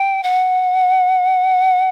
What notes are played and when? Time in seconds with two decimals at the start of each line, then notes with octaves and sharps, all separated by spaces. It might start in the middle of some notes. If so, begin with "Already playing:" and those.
Already playing: G5
0.23 F#5